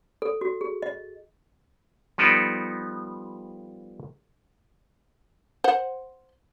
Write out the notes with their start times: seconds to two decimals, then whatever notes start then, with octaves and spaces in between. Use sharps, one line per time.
0.22 A4
0.41 F#4
0.61 G#4
0.82 D#5
2.18 F3 G3 B3 D#4 A4 D5
5.64 C5 F#5